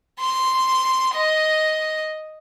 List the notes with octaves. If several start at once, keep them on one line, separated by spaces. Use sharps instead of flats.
C6
D#5